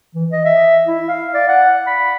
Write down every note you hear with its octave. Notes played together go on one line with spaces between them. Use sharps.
E3
D#5
E5
E4
F5
D5
F#5
B5